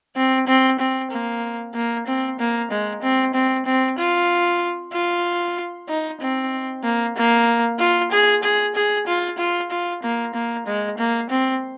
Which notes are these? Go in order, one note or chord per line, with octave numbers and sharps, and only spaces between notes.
C4
C4
C4
A#3
A#3
C4
A#3
G#3
C4
C4
C4
F4
F4
D#4
C4
A#3
A#3
F4
G#4
G#4
G#4
F4
F4
F4
A#3
A#3
G#3
A#3
C4